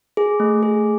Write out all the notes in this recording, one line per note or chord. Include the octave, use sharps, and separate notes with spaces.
G#4
A3
G#4